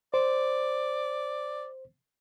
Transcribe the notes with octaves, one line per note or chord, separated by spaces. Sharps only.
C5 D5